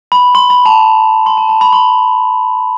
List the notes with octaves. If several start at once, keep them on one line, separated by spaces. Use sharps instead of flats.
B5
C6
B5
A5
B5
C6
A5
A5
B5
C6